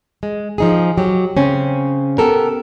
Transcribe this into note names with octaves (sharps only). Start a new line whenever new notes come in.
G#3
F3 D#4 G#4
F#3 G4
C#3 C4 C#4
B3 G4 A4 A#4